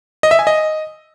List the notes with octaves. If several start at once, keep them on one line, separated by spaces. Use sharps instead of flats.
D#5
E5
G#5
D#5